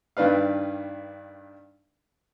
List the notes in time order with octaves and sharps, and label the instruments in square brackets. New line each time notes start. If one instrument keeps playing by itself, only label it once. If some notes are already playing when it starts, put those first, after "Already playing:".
[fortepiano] G2 D#3 D4 B4 F5